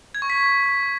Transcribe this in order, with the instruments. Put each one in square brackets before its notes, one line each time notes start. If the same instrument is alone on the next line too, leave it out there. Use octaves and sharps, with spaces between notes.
[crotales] G#6
C#6
B6